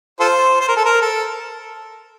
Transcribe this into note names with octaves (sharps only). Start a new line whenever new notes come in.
F4 A4 C5
C5
A#4
A4
A#4
A4